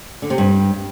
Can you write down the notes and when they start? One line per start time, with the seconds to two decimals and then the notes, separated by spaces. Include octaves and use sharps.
0.22 D3
0.30 C3
0.38 G2